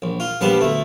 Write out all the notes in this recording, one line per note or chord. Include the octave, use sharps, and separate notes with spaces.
A#1
F4
A#1 G3 B3 F5 A5
D2 A3